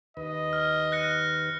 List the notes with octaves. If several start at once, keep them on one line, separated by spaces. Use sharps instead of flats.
D#2 B4 D#5
F6
F#6 A#6 C#7